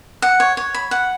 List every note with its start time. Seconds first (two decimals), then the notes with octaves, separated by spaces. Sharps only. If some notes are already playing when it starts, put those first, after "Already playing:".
0.22 F#5
0.40 C#5
0.57 C#5
0.74 B5
0.91 F#5